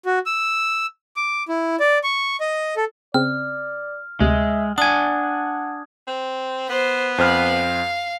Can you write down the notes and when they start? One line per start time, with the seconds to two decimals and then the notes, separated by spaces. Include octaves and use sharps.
0.06 F#4
0.26 E6
1.16 D6
1.48 E4
1.80 D5
2.03 C#6
2.40 D#5
2.76 A4
3.14 C#3 C4 D5 F6
4.20 D2 C3 G#3 E5
4.78 D4 F#5 G#5 D#6 G#6
6.07 C4
6.69 B3 C5
7.18 F2 C5 F5 F6